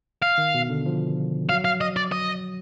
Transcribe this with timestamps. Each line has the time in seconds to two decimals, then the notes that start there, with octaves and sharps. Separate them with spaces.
0.22 F5
0.38 D#3
0.54 B2
0.70 D3
0.86 F3
1.49 F#3 F5
1.65 F5
1.81 D#5
1.97 D5
2.12 D#5